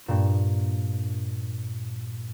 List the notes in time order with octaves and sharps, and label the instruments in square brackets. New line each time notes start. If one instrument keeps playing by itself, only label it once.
[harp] G2 A#2 E7